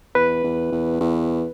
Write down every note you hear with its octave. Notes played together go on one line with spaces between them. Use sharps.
E2 B4
E2
E2
E2